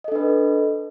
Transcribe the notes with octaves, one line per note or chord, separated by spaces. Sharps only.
D4 A4 B4 D#5